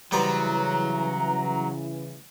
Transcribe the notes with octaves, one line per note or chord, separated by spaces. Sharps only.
C#3 E3 F#3 G3 B3 C5 A#5